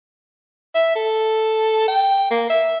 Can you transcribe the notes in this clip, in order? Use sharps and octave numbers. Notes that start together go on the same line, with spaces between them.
E5
A4
G5
A#3
E5